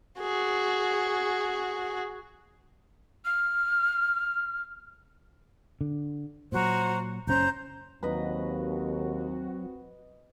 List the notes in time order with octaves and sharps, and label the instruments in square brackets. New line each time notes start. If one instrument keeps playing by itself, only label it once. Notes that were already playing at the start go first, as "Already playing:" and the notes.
[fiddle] F#4 G#4
[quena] F6
[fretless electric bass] D3
[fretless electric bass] A#2 F#3 [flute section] F#4 C5 A#5
[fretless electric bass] F#1 A2 C#4 [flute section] C5 A#5 G6
[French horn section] D#2 [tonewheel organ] F#3 [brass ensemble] C4 F#4 [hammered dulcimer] B4 D#5